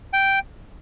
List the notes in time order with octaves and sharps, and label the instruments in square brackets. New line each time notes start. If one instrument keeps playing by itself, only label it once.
[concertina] G5